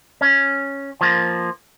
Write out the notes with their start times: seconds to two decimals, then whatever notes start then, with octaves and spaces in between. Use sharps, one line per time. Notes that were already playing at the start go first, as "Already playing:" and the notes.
0.21 C#4
1.01 F3 A#3